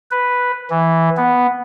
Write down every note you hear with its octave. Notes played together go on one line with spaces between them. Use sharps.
B4
E3
B3